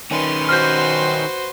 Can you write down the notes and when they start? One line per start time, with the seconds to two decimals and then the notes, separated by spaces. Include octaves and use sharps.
0.11 D#3 C#4 B4 C6
0.49 F#4 C5 F6 G6